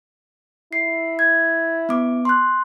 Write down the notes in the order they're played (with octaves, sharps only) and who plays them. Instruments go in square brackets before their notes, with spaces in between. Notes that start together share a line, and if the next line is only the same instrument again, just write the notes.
[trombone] E4 [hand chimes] C7
[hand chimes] G#6
B3 D6
C6 F#6